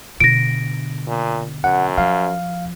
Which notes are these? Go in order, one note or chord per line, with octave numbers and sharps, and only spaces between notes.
B2 D3 A#6 D7
A#2
F#2 F#5
F3 F5